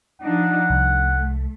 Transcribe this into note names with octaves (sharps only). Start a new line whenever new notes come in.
F3 D4 D#4 F#5
C2 A3